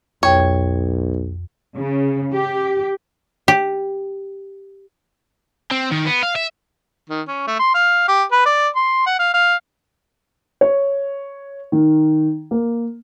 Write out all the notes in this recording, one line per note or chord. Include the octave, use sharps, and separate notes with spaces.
B1 F2 C#5 G5
C#3
G4
G4
C4
D#3
B3
F5
E5
D#3
C#4
A3
C6
F5
G4
B4
D5
C6
F#5
F5
F5
C#5
D#3
A#3